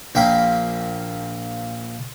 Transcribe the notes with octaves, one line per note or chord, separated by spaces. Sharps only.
A#1 A#3 G5 B5